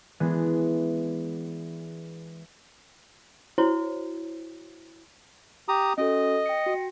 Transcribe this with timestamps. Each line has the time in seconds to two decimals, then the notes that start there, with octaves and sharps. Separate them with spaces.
0.20 E3 G#3 B3 D4
3.58 E4 F#4 C5 C#5
5.69 G4 A#5 D#6
5.98 C#4 F#4 A4 D#5
6.46 G5 A#6 C#7
6.66 F#4